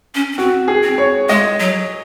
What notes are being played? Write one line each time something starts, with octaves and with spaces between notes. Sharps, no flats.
C#4
C#4
C4 F#4
G#4
C4
C#5
G#3 D#5
F#3